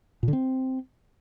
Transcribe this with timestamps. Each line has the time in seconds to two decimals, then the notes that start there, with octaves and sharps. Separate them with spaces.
0.23 A#2
0.28 D3
0.33 C4